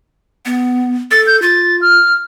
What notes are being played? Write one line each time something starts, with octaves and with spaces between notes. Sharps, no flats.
B3
A4 A6
G6
F4 A6
F6